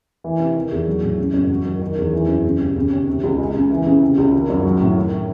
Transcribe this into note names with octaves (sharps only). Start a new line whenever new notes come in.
E3
C3
D#3
E2
F#3
A2
C#3
F#2
F#3
D#3
D#3
E2
E3
F#2
C#3
D#2
C#3
D#2
C3
C#2
G#3
C#3
E3
C#3
C3
C#2
D#3
F#2
F#3
A2
D#3